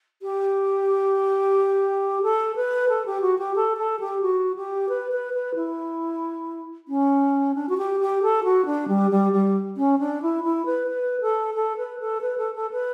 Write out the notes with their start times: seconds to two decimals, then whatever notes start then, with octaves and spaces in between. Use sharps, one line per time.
0.22 G4
2.22 A4
2.55 B4
2.88 A4
3.05 G4
3.21 F#4
3.38 G4
3.55 A4
3.77 A4
3.99 G4
4.22 F#4
4.56 G4
4.88 B4
5.11 B4
5.33 B4
5.55 E4
6.88 C#4
7.54 D4
7.68 F#4
7.77 G4
8.00 G4
8.22 A4
8.43 F#4
8.65 D4
8.88 G3
9.11 G3
9.32 G3
9.77 C#4
9.99 D4
10.22 E4
10.43 E4
10.65 B4
10.87 B4
11.21 A4
11.54 A4
11.77 B4
11.99 A4
12.21 B4
12.37 A4
12.55 A4
12.71 B4